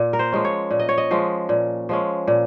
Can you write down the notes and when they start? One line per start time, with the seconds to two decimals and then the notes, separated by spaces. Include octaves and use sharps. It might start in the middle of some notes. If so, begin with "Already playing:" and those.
Already playing: A#2
0.13 A#4
0.19 C5
0.32 F3 G#3 C#4
0.45 C#5
0.71 A#2
0.79 D#5
0.89 C#5
0.98 D#5
1.11 F3 G#3 C#4
1.49 A#2
1.89 F3 G#3 C#4
2.28 A#2